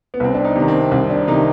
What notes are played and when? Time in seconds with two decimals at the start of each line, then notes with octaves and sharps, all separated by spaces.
0.14 B3
0.20 C2 C4
0.34 D4
0.45 D#4
0.56 C3 D#3
0.68 C4
0.91 C2 C4
1.10 D4
1.28 C3 D#3 D#4